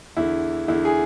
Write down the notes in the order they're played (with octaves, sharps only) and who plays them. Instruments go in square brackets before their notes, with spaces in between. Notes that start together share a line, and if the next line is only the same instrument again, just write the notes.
[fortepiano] E2 D3 E4
E2 D3 E4
G#4